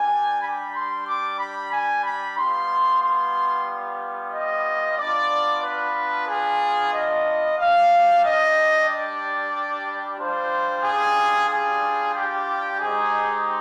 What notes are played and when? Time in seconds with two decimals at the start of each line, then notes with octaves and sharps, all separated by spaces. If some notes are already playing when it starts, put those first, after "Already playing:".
Already playing: G3 D4 G4 G#5
0.42 B5
0.75 C6
1.07 D6
1.39 B5
1.73 G#5
2.04 B5
2.37 G3 B3 F4 C6
3.03 C6
4.33 D#5
4.98 B3 D4 F4 D5
5.64 B4
6.28 G#4
6.94 D#5
7.59 G3 D4 G4 F5
8.23 D#5
8.89 D5
10.18 G3 D4 F4 C5
10.84 G#4
11.49 G#4
12.15 G4
12.79 G#3 C4 D#4 G4 G#4